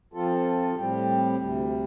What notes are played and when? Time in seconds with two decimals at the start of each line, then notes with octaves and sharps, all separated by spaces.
0.13 F3 C4 F4 A4
0.75 A2 G3 C4 G4
1.37 D2 C3 G3